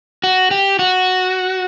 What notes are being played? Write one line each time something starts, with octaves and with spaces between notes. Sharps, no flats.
F#4
G4
F#4